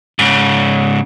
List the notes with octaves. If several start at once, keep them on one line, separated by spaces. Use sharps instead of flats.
G#2 C#3